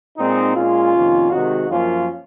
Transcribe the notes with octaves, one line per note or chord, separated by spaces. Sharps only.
A#2 G#3 C4 D#4
A#2 G#3 C#4 F4
F2 C3 D#3 A#3
C3 D#3 G#3 D#4 F#4
F#2 F3 A#3 C#4 F4